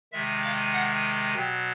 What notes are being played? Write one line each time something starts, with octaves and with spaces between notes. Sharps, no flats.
C3 D#3 G#3 E5
F5
F#5
G5
B2 F#3 G5